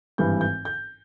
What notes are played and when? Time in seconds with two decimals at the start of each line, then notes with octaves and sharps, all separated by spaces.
0.18 G#1 G2 E3 G6
0.41 G6
0.65 G6